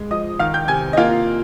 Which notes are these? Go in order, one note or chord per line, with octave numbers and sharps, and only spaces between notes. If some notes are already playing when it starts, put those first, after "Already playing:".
Already playing: G#3
F3 D#5 D#6
D#3 F5 F6
G5 G6
C3 G#5 G#6
D#5
A#3 F4 F5